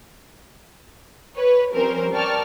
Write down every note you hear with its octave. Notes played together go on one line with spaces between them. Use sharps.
B4 C#5
F3 G3 C4 C#4 A#4 C5
A#4 D5 G5 A5 C#6 F6